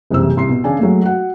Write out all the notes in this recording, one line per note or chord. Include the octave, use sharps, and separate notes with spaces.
F#1 C2 C3 E3 E6
C2 C6 C7
B2
C#3 D4 G#5
F#3 G#3 A3
F#4 F#5